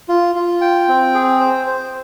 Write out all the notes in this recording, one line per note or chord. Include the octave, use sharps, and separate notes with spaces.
F4
F4
G5
C4
G#4
C5
C5